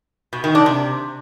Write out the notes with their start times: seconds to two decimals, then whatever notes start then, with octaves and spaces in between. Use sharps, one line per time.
0.33 B2
0.44 D#3
0.55 D4
0.66 C3